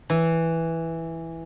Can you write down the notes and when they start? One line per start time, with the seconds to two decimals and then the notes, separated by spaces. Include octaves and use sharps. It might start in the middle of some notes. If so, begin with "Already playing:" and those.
0.10 E3